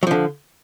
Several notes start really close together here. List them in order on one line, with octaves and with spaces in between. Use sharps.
F#3 F3 D3